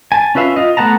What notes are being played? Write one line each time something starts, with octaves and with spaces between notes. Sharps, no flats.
G#5 A5
C#4 F4 B4 E5 F5
F4 D#5
A3 B3 F#5 A5 A#5